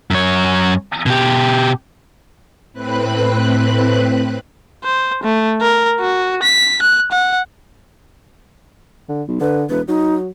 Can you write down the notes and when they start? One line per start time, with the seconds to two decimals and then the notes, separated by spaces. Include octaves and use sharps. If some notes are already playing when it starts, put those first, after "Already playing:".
0.11 F#2 C#5
1.06 B2 G4
2.73 A2 C4 B4 B5 F#6
4.84 C5
5.23 A3
5.61 A#4
6.00 F#4
6.43 B6
6.82 F#6
7.11 F#5
9.09 D3
9.28 B1
9.41 D3 B4
9.70 E1 B4
9.88 F#3 D#4